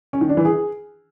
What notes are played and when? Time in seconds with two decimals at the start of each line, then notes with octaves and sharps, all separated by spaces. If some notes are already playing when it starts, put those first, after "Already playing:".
0.13 C#4
0.21 D#3
0.29 D4
0.37 E3
0.45 G#4